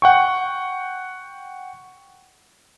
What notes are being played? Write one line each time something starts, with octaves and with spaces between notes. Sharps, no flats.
F#5 G5 C#6